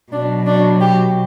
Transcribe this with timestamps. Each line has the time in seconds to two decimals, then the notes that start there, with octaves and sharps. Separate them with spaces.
0.12 B2 F#3 D4
0.46 D4
0.80 G4